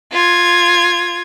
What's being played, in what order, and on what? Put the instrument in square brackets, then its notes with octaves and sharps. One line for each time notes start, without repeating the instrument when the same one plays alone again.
[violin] F4 G#6